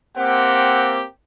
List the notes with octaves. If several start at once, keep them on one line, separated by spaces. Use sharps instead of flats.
A#3 C4 G4 F#5